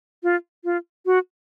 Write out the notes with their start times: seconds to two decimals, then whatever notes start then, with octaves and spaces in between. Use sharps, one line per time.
0.23 F4
0.64 F4
1.06 F#4